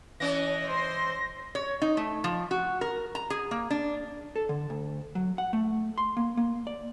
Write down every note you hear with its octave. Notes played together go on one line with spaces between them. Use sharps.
E3 C#4 D#5 A#6
C5 C6
C#5
D#4
A3
F3
F#4
A#4
A#5
G#4
A#3
D4
A4
D3
D2
F#3
F#5
A3
C6
A#3
A#3
D5